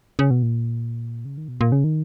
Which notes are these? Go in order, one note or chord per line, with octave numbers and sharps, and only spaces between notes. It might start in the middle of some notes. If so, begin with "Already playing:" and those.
C#3
B2
A#2
C#3
D#3
B2
A#2
C#3
D#3